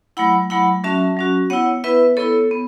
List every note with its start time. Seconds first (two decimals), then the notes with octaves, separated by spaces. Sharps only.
0.17 F#3 A3 E4 F#5 B5
0.50 F#3 A3 E4 F#5 B5
0.84 F#3 C#4 F#4 E5 A5
1.17 F#3 C#4 F#4
1.50 B3 E4 C#5 F#5
1.84 B3 E4 B4 E5
2.17 B3 E4 A4 C#5
2.51 B3